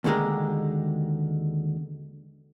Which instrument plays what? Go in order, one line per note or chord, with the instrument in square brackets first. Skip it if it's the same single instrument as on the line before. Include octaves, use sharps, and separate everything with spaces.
[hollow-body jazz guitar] D#2 B2 D3 G#3 G4 A#4